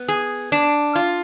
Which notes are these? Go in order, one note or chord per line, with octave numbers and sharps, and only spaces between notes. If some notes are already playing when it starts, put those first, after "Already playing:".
Already playing: B3
G#4
D4
F4